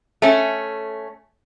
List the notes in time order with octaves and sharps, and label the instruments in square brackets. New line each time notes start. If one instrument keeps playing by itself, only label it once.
[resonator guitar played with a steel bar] A3 C#4